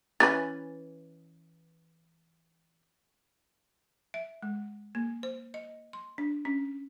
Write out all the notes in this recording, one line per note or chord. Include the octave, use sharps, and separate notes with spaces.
E3 C#4 B4 A6
E5
G#3
A#3
C5
D#5
C6
D4
C#4